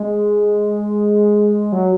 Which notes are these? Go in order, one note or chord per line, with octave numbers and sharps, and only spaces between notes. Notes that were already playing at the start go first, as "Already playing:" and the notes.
Already playing: G#3
F#3